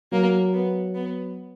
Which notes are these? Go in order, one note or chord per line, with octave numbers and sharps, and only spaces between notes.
F#3 A#3
B3
B3